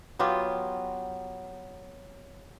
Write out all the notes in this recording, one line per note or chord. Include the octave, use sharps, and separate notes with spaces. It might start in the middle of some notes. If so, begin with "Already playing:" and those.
F#3 B3 F4 G4